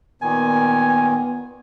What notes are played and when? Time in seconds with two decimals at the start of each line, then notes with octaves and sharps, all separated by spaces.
0.22 A#2 D#3 B3 G#5